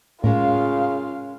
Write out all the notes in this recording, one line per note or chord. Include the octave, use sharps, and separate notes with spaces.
A2 C#3 G#3 C#4 F4 A#4 F5